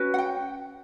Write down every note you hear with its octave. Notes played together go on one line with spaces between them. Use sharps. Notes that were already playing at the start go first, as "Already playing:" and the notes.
Already playing: C#4 F#4 B4
F#5
G5